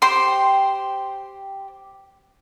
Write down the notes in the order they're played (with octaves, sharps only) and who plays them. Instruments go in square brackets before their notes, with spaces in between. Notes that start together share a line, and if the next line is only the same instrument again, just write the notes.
[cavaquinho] G4 C5 G5 C6